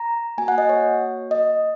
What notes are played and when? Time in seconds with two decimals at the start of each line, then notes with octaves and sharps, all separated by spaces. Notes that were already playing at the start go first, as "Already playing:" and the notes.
Already playing: A#5
0.38 A#3 F#4 G#5
0.48 F#5
0.58 D#5
0.69 C#5
1.31 D#5